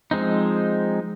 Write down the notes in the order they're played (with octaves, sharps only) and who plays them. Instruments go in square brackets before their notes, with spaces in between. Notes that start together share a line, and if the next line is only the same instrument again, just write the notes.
[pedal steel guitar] F3 G#3 C4 D#4